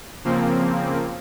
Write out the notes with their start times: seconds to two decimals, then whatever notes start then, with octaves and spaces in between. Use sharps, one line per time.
0.24 C#3 F3 A#3 C4